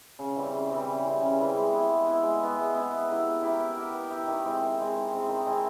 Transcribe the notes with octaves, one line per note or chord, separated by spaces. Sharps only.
C#3
E3 G3 C4
C#3
E3 G3 C4
C#3
E3 G3 C4
C#3
E3 G3 C4
G#3
B3 E4
G#3
B3 E4
G#3
B3 E4
G#3
B3 E4
B3
E4 G4 A#4
B3
E4 G4 A#4
B3
E4 G4 A#4
B3
E4 G4 A#4
D#3
G#3 C4 E4
D#3
G#3 C4 E4
D#3
G#3 C4 E4
D#3
G#3 C4 E4